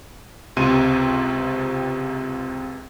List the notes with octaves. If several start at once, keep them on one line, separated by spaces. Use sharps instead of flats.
C#2 C3 C4 C6 D#7